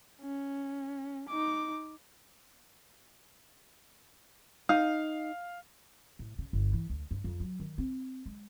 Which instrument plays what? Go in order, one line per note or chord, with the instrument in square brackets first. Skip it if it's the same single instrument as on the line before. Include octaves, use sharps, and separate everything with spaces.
[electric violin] C#4
D#4 D6
[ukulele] D#4 [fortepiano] F5
[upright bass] A2
C#3
G1
E3
D2
G2
F2
F#3
D#3
C4
G#3